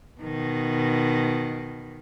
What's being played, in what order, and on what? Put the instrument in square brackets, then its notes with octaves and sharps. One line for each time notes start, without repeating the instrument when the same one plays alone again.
[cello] B2 D#3